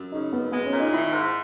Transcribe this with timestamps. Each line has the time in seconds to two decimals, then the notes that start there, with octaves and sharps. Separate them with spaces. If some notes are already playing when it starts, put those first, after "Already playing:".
Already playing: F#2
0.12 C#3 D#4
0.33 F#2 B3
0.52 G#3 B3
0.66 C#4
0.72 A#2
0.79 D#4
0.93 D#3 E4
1.13 G#2